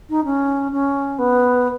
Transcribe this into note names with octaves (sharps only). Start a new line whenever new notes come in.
D#4
C#4
C#4
B3